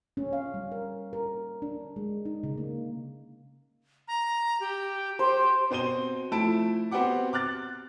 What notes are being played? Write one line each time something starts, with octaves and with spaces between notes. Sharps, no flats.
C#4
F5
G3
A#4
A#4
D4
G#3
D#4
C#3
A#3
A#5
G4
G4 C5
B2 C4 C5 D#7 G7
F3 A3 E4 A5 D7
B3 C4 F#4 G4 F#5 D6
D6 F6 F#6 A6